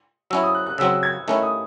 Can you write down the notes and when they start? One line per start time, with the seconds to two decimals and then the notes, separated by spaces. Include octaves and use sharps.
0.30 F#3 C#4 E4 E6
0.43 D#6
0.55 F#6
0.66 F#6
0.78 C#3 F#3 C4 E6
1.03 G#6
1.28 D#3 A3 C#4 E4
1.43 D#6